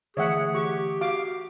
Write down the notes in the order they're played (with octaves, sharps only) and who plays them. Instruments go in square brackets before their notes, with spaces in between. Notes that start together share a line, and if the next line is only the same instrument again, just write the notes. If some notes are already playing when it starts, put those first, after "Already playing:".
[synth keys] D3 E3 A3 [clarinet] G#4 [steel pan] C#5 E5 F#5
[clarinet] G4 [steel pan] C#6
[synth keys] F#4 [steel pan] F5 D6